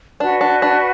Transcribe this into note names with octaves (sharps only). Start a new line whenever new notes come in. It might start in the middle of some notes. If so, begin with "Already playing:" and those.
D4 F#4 B4 F#5
D4
D4